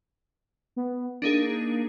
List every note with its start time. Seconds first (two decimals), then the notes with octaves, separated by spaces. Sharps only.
0.76 B3
1.22 A#3 D4 D#4 G#4